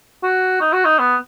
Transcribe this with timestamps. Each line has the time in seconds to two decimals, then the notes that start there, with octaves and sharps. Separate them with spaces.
0.23 F#4
0.61 D#4
0.73 F#4
0.85 D#4
0.99 B3